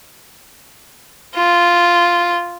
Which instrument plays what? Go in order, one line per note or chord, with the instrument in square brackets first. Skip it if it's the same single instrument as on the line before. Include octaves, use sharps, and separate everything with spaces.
[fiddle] F4